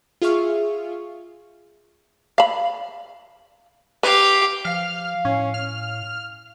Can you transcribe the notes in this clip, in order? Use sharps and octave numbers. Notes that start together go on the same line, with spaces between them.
F4 G#4 E5 F5 C#6 F6
F5 B5
G4 B4 F5
F3 F5 F6
A2 C#4
F6